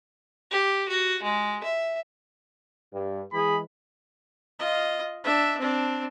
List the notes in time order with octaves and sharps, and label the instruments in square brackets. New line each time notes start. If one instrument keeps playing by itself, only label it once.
[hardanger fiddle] G4
F#4
G#3
E5
[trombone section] G2
[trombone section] E3 G#3 [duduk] G#4 [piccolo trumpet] B5
[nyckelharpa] F4 D#5
D4 E5
C4 D4